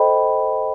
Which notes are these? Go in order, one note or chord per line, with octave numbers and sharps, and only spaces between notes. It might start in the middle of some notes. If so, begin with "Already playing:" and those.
Already playing: A4 C5 D#5 G5 B5